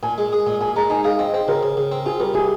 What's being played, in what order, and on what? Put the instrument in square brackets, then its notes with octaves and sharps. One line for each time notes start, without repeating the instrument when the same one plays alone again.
[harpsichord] A#2 [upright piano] G#5
[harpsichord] G#3
G#4
A#2
[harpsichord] A#2 [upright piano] G#5
[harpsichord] G#3 [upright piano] A#5
[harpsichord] D#4 [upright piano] G#5
[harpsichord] G#4 [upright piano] F5
[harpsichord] C4 [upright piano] D#5
[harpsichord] C4 [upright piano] C5
[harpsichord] C#3 [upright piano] A#4
[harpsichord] C#3
C#3
C4
[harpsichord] F4 [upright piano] G#4
[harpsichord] G3 [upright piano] A#4
[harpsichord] C3 [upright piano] G#4